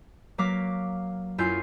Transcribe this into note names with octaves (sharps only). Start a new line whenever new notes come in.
F#3 A#3 F5 D6 B6
F#2 E4 F4 G#5 G6 C7